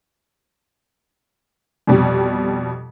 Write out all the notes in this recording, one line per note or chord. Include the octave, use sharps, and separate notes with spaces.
F2 B2 G3